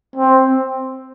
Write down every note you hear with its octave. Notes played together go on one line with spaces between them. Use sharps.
C4